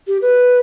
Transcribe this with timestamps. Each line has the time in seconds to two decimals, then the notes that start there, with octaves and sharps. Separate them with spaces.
0.07 G4
0.22 B4